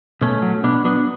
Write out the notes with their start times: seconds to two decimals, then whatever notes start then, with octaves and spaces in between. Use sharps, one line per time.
0.21 B2 A3 C#4
0.42 F#3
0.63 B2 B3 D4
0.85 F#3 B3 D4